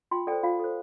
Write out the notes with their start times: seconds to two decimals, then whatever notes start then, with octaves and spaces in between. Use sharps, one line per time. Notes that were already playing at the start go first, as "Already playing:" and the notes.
0.11 F4 G5 C6
0.27 A4 C5 D5 G5
0.43 F4 F5
0.59 A4 C5